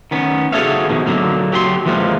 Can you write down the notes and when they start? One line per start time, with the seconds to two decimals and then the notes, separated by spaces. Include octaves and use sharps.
0.11 D#3 B3 C#4
0.52 F#4 G#4 A4 C#5 E5 F5
0.89 B2 D#3 F3
1.06 D3 F#3 A#3
1.52 F#3 G4 A4 C6
1.86 E3 F3 G#3 A#3